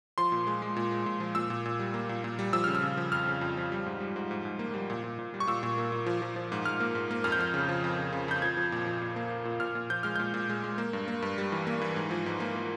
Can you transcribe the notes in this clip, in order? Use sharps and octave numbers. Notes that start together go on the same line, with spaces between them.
F3 C6
A#2
G#3
G#3
A#2
G#3
A#2
F3
A#2 E6
A#2
A#2
G3
A#3
A#2
A#2
G3
F3 E6
C#3 F6
E6
C#3
F3
F2 F6
C#3
F2
F3
G3
G#2
G3
G#2
G#2
G#2
A#3
G3
A#2
A#2
A#2
G3
C#6
A#2 E6
A#2
A#3
A#2
F3
F3
F3
G#2
G#2 F6
A#3
G#2
A#3
F2 F6
G6
F3 F6
C#3
F3
F2
C#3
C#3
F2 G6
F3 G#6
F3
A#2
F3
A#2
A#3
A#3
A#2
A#2 F6
A#2
F3 G6
G#3 F6
A#2 G6
A#2
G#3
G#3
A#3
G2
A#3
G2
G3
E3
A#3
E3
G#2
F3
G#2
A#3
A#3